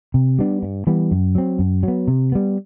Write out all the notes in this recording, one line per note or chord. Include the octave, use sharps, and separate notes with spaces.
C3
G3 B3 D4
G2
E3 G3 B3
F#2
F#3 C4
F#2
F#3
B3
C3
G3 B3